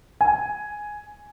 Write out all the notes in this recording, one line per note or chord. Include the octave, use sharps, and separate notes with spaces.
G#5